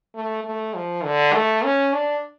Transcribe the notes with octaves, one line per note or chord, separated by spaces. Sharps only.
A3
A3
F3
D3
A3
C#4
D4